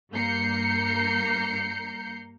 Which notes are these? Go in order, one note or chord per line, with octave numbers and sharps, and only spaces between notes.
G2 A#3 A#5 G6 C7 C#7